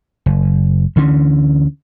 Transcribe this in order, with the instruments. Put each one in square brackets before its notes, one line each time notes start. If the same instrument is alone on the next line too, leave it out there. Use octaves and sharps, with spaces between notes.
[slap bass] F#1
D2 D3 E3 C#4